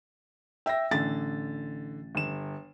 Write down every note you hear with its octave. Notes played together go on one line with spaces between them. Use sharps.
E5 G5 E6 A#6
A1 D3 A6
G1 E7